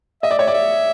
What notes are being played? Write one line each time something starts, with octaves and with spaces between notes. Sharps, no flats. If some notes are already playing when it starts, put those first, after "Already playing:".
D#5 E5
D5
C#5 E5
D5
E5